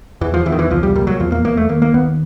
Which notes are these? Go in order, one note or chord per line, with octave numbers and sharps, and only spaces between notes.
E2 E3
F3
E2 E3
D#3
E3
C2 F3
G3
A#2 G3
F#3
E2 F3
A#3
E2 A#3
A3
D#2 A#3
A#3
D#2 B3